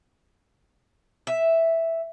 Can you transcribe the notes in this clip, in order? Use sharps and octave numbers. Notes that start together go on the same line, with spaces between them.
E5